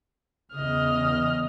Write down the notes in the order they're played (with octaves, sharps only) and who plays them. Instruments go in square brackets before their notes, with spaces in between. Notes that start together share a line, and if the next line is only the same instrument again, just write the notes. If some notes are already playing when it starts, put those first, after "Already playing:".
[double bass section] E2 C#3 [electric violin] D#5 F6